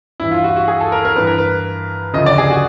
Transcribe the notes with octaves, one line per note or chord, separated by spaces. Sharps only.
G2 E3 E4
F4
F#4
F#4
G#4
A4
A#4
A#4
G2 E3 B4
A#4
B4
D2 C#3 F3 D#5
D5
G#4
F#4